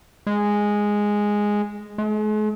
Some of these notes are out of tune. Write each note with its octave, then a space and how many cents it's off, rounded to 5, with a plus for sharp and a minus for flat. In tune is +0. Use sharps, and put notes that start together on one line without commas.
G#3 -5
G#3 +45